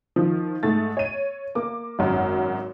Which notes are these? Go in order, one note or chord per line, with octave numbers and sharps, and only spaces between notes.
D#3 F3
G#2 A3 A6
C#5 D#7
A#3 D6
G#1 F#2